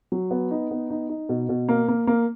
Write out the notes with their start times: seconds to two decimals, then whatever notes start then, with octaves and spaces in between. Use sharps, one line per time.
0.12 F#3
0.31 B3
0.51 D#4
0.71 B3
0.90 D#4
1.09 D#4
1.29 B2
1.49 B2
1.69 A#3
1.88 A#3
2.07 A#3